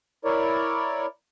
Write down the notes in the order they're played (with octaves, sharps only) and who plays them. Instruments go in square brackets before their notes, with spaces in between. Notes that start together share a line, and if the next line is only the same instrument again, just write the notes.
[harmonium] E4 A#4 C#5 D5